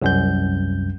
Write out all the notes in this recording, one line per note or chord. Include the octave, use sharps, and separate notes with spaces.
C2 F#2 G6